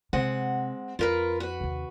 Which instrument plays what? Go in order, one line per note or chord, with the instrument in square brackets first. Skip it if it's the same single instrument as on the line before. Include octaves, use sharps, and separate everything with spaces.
[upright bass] C3 [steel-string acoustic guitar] G#3 C4 F#5
[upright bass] F2 [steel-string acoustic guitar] F4 A#4 B4
[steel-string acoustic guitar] F#4 B4
[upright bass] D#2 C3